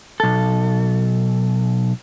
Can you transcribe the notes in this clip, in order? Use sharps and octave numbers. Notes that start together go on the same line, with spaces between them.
B1 A4